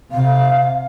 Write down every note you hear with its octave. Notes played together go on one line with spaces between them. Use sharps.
C3 F5